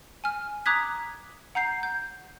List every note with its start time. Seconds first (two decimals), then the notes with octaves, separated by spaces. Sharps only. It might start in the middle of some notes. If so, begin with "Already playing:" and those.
0.24 G#5 F6
0.66 A#5 D6 D#6 F#6 G#6 B6
1.55 F#5 A#5 G6 C7
1.83 G6